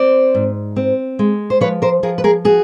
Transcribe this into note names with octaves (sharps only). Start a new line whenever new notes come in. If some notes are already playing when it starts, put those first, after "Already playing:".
Already playing: C4 C5 D5
G#2
C4
G#3
C5
F3 B4 C#5
A#4 C5
F3 G#4 A#4
B4
G#4 A#4
F#4 G#4